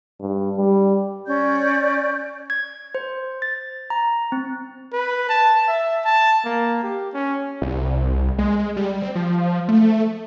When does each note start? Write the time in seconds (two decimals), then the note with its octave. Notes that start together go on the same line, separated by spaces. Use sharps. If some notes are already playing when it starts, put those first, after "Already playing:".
0.20 G2
0.57 G3
1.26 C#4 D5 G6
2.50 G#6
2.95 C5
3.42 A6
3.90 A#5
4.32 C4
4.93 B4
5.29 A5
5.68 E5
6.05 A5
6.45 A#3
6.83 G4
7.13 C#4
7.62 C2
8.38 G#3
8.77 G3
9.02 C4
9.15 F3
9.68 A3